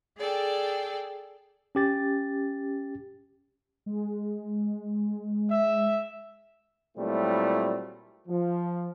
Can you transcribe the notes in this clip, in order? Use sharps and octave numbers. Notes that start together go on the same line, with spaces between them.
G#4 A4 D5 G5
C#4 G4 A6
G#3
E5
A#2 F#3 G3 A3 C4 E4
F3